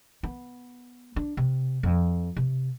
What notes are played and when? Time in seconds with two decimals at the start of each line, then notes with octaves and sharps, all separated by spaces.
0.23 B3
1.16 D4
1.37 C3
1.83 F2
2.37 C3